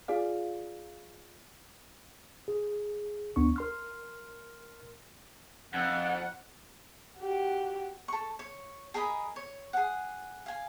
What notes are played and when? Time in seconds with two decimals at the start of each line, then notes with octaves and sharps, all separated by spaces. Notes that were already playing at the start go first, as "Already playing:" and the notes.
0.08 F4 G#4 D5 F5
2.48 G#4
3.36 D2 B3 D4 C#6
3.56 A#4 C6 F6
5.74 F2 F#5
7.18 F#4 G4
8.08 A4 C#6
8.39 C#5
8.94 G#4 A#4 D#5 B5
9.36 C#5
9.73 G#4 F#5
10.46 F5 G#5